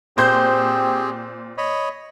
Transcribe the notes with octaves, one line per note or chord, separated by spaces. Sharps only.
A#2 C4 G4 G#4 C5 G6
C#5 D#5 B5